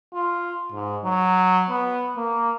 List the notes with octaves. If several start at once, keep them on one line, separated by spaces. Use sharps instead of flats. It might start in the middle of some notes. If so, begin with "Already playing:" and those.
F4
G#2
F#3
B3
A#3